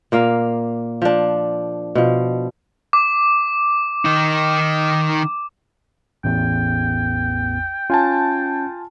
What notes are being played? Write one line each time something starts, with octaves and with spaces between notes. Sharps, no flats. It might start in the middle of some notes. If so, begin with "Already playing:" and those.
A#2 A#3 F5
F3 D4
B2 F3
D6
D#3 D#4
A1 E2 G5
C#4 F4 G#5 A5